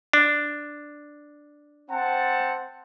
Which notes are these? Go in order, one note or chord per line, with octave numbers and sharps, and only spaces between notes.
D4
C4 F#5 A5